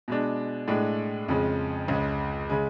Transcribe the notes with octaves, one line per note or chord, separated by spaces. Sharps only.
B2 G#3 D4
A2 G#3 D4
F2 C#3 G#3
C#2 C#3 G#3
C#3 G#3